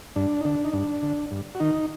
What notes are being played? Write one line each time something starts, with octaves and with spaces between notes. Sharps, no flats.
G2 D4
D#4
D3 D4
D#4
G2 D4
D3
G2
F#4
D#3 D#4